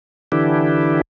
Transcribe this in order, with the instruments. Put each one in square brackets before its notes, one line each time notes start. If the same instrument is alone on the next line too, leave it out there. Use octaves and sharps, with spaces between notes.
[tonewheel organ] D3 E3 D4 E4 G4